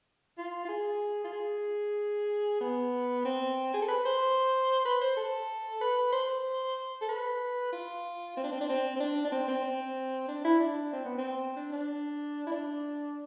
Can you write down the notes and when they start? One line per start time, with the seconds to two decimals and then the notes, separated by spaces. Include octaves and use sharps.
0.38 F4
0.65 F4
0.69 G#4
1.24 F4
1.33 G#4
2.61 B3
3.25 C4
3.74 G#4
3.82 A4
3.88 B4
4.05 C5
4.85 B4
5.01 C5
5.17 A4
5.81 B4
6.13 C5
7.02 A4
7.09 B4
7.72 F4
8.37 C4
8.44 D4
8.52 C4
8.61 D4
8.69 C4
8.96 C4
9.00 D4
9.25 D4
9.32 C4
9.48 C4
9.64 C4
10.28 D4
10.44 E4
10.60 D4
10.93 C4
11.05 B3
11.18 C4
11.56 D4
11.72 D4
12.47 E4
12.51 D4